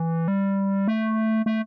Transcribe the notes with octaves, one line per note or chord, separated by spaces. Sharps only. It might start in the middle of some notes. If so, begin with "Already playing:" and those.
Already playing: E3
G3
A3
A3